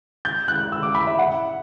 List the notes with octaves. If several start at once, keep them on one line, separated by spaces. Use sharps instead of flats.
G6
F#6
E6
D6
B5
E5
F#5